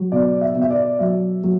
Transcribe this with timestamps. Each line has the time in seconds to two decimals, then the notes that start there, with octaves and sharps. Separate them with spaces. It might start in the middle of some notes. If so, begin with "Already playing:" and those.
Already playing: F#3
0.12 B2 D5
0.41 E5
0.55 B2
0.61 E5
0.70 D5
0.99 F#3 E5
1.44 F#3